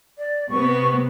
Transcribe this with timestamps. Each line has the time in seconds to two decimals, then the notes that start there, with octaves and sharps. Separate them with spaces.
0.18 D5
0.50 C3 B3 C#6